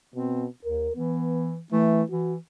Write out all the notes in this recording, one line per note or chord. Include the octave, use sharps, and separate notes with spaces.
B2 C4
D#2 A#4
E3 B3
E3 A3
E3 F#4